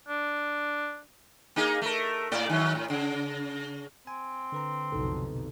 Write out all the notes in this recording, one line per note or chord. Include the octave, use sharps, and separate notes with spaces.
D4
A#3 D#4 G#4
A3 A#4
A2 A3 D5
D#3 F#3
A2
C#3
C4 G#5
D3 B4 A#5
B1 F2 C3 D#4 A4